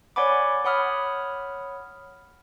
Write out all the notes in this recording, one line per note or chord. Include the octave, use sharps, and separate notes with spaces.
C#5 D5 F#5 G#5 B5 D6
C#5 F#5 B5 D#6 F6